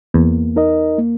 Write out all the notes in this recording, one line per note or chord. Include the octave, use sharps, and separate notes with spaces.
E2 A#3
D#4 A#4 D#5
A#3